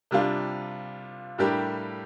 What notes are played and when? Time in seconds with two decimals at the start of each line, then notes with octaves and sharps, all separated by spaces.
0.11 C3 G3 D4 F4
1.38 A2 G3 D4 G4 A#4